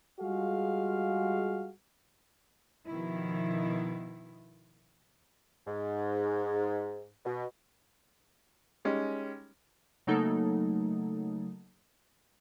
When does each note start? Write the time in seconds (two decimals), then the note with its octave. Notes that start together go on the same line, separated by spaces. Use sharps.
0.19 G3 G#3 F4 F#4 G#4 F5
2.87 B2 D#3 F3 E4
5.67 G#2
7.25 B2
8.85 G3 G#3 C#4 D#4
10.07 C#3 F#3 A3 A#3 D#4 A4